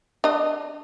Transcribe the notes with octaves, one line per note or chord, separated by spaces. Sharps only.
D4 D#5